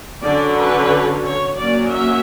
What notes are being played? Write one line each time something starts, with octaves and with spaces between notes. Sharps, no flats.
D3 F#3 C#4 D5
B4
C#5
F#3 A#3 C#4 D5
E5